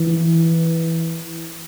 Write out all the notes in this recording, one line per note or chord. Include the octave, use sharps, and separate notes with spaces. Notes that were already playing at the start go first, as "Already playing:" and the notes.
Already playing: E3